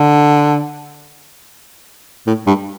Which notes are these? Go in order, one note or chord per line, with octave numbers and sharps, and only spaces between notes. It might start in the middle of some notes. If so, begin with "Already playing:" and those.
Already playing: D3
A2
G2